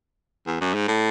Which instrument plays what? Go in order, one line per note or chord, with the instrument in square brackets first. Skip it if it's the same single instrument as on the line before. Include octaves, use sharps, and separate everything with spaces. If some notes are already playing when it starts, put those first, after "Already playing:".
[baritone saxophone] E2
F#2
G#2
A2